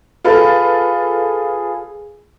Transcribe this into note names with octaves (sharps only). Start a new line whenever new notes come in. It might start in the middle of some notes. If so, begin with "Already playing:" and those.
F4 G#4 A4 B4